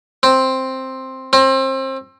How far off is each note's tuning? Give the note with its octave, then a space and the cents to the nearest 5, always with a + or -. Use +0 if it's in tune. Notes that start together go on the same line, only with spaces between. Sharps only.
C4 +5
C4 +30